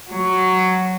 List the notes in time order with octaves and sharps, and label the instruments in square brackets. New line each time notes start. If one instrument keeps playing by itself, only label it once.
[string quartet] F#3